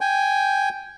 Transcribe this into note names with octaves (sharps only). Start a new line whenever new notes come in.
G5 G#5